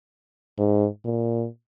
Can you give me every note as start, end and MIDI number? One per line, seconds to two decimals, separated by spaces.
0.58 0.87 44
1.05 1.46 46